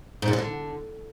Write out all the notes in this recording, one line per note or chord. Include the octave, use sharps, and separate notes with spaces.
G#2
A#2
E3
D3